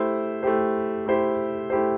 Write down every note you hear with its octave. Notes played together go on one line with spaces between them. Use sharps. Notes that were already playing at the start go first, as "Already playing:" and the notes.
Already playing: A3 E4 G4 C5
A3 E4 G4 C5
A3 E4 G4 C5
A3 E4 G4 C5